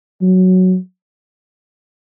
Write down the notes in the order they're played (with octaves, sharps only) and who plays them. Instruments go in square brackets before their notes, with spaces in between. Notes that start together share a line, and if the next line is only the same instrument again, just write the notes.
[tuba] F#3